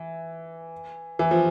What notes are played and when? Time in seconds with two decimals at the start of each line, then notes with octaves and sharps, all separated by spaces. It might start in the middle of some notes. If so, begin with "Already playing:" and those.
Already playing: E3
1.19 E3
1.31 F3